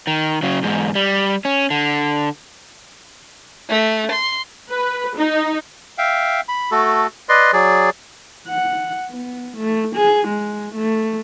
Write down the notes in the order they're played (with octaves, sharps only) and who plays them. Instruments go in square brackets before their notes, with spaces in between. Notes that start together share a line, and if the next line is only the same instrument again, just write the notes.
[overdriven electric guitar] D#3
C#3 F#3
E2 G#2
G3
C#4
D3
[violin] A3
C6
[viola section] B4
D#4
[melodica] E5 F5 G5
B5
A3 F#4 A4
B4 D5 D#5 C6
F#3 G#4 D5
[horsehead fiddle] F#5
B3
A3
G#4
G#3
A3